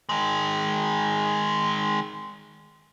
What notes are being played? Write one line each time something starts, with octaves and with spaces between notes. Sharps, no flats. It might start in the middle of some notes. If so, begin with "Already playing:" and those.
D#3 G#3